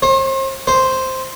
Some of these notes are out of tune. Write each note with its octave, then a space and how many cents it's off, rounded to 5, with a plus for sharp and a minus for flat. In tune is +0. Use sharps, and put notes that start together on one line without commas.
C5 +40
C5 +0